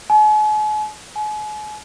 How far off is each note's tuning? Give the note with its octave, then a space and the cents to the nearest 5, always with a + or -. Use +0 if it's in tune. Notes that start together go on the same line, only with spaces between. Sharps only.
G#5 +45
G#5 +40